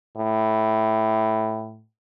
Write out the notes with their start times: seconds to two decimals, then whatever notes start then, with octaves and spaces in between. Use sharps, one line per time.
0.16 A2